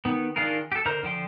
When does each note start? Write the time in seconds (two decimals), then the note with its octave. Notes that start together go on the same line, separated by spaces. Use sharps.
0.05 D#3 B3
0.36 D#3 D4 F4 G#4 A#4
0.72 G4 A4
0.86 D3 A#4 C5 A#5
1.03 D3 F3 G5 C6